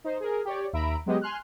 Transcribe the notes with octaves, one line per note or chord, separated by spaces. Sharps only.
D#4 C5
G#4 A#4
G4 C#5 D5
D#2 E5 A#5 B5 D7
F#3 G#3 B3 G4 D#5
G#5 C6 F6 F#6